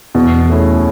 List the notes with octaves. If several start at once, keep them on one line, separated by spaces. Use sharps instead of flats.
E2 B2
A3 C#4 E4 G#4